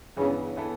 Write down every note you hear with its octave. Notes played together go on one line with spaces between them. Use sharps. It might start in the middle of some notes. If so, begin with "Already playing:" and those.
G2 C#3 E3 B3
E3 B3 E4 A4